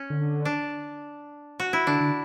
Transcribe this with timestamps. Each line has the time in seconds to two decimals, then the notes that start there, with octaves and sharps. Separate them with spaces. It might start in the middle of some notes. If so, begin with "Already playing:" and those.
Already playing: C#4
0.10 D3
0.45 D4
1.60 F#4
1.73 E4
1.87 D3 D4
2.00 D3